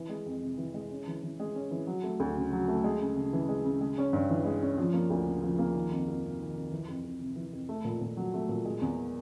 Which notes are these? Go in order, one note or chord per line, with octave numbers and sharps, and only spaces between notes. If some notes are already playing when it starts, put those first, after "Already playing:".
Already playing: E3
G#3
F2
C3
E3
G#3
C#4
E3
E3
G#3
C#4
E3
F#3
A3
D2
C#3
F#3
A3
G#3
C#3
C#3
E3
G#3
C#3
G#3
C#4
G2
E3
G#3
C#4
F3
A#3
D2
C#3
F3
A#3
D#3
F2
F2
C3
D#3
F2
E3
F2
F2
C3
E3
F2
A3
A#2
A#2
F#3
A3
A#2
G#3
E2